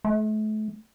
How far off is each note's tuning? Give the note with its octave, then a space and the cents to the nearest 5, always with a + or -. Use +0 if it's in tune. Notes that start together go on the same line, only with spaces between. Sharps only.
A3 -35